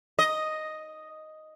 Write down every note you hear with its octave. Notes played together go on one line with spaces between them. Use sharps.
D#5